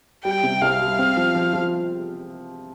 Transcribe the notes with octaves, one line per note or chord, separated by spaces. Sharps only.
G3 G5
C3
C2 F5
G3
C4
F3
F3
F3